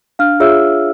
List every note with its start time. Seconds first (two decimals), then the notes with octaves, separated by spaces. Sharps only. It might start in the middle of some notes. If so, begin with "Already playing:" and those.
0.19 D4 F5 F6
0.40 F4 G#4 C#5 E5 E6